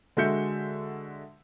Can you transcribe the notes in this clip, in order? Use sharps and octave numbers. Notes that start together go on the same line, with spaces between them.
D3 G#3 F#4 E5 G6 C#7